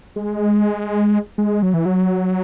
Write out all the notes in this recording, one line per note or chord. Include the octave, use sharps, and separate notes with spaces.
G#3
G#3
F#3
E3
F#3